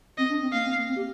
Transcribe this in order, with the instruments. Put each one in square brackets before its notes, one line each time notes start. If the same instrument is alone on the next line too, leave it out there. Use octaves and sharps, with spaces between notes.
[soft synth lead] C4 [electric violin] D#5
[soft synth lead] D4
C4
[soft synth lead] A#3 [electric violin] F5
[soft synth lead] C4
A#3
C4
G4